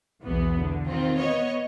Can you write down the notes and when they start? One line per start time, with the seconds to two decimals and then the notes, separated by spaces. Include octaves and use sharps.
0.21 B1 E2 E3 B3
0.57 D3
0.87 D#3 C4 F4
1.17 B3 C#5 D#5